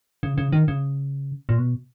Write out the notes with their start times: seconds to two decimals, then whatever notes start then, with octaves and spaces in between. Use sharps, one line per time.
0.23 C#3
0.38 C#3
0.52 D#3
0.68 C#3
1.49 A#2
1.58 B2